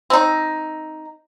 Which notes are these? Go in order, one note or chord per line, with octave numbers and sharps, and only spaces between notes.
C4 D#4